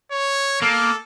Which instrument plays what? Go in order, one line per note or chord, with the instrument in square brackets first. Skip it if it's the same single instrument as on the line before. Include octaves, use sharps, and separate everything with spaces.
[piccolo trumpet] C#5
[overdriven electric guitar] A#3 [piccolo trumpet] A4